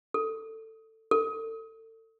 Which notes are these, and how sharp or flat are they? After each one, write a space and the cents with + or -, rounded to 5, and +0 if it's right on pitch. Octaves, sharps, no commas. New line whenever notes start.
A4 +15
A4 +30